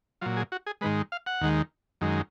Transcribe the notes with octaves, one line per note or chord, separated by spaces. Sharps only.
A#2 F#3 F4
G#4
F#4
G#4
G#2 D#3 G#3 B4
F5
F#5
D#2 D#3 G#3
F#2 D#3 G#3